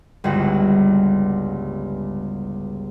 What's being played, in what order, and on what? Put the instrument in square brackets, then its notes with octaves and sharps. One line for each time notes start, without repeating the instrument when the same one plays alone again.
[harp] G1 C#2 G2 F#4